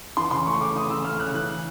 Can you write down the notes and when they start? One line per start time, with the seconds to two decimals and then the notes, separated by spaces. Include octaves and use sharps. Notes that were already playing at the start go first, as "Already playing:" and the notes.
0.17 E3 C6
0.31 C#3 C6
0.46 A3 C#6
0.61 C#3 D6
0.75 E3 D#6
0.90 C#3 E6
1.05 A3 F6
1.20 C#3 F#6
1.35 E3 F#6